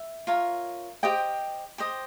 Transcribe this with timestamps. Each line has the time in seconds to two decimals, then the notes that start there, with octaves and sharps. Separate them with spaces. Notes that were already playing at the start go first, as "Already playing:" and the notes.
Already playing: E5
0.27 F4 A#4 C#5
1.03 G4 C5 D#5 G5
1.78 G4 C5 D#5